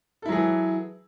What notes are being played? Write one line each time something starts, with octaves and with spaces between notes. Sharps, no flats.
E3 F#3 E4 G#4 A4